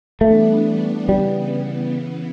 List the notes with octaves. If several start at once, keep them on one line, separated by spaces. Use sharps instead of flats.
E3 G3 A3 B3 D4
C#3 E3 G3 B3